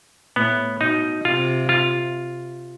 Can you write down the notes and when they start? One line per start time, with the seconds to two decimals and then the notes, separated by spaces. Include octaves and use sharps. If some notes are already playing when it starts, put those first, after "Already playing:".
0.36 A2 B3
0.81 B2 D#4
1.25 C3 F4
1.69 F4